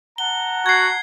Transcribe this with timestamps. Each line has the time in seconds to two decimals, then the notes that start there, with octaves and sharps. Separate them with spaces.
0.18 F#5 A5 A#5 G7
0.66 F#4 G#6 C7